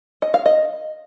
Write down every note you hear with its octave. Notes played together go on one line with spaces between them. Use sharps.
D#5
F5
D#5